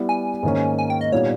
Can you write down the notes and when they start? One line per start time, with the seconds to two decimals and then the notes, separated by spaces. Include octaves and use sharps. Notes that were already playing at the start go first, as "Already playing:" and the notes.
Already playing: G3 B3 E4
0.09 G#5
0.43 G#2 D#3 A#3 C#4
0.79 G#5
0.90 G5
1.01 D#5
1.12 A#2 G3 B3 D#4 C#5